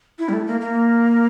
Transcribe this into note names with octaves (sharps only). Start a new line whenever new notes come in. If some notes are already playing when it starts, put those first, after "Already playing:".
E4
G3
A3
A#3
A#3